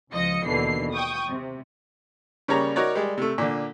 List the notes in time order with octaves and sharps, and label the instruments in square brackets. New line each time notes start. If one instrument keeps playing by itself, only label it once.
[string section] C#2 F3 D#5 A#6 C#7
D#2 B2 D3 E3 C7
G5 C#6 D#6
C3
[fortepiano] C#3 G3 A#3 C#5 A#5
D#4 F#4 A#4 C#5 D5
G3 G#3
C3 A3
A#2 D3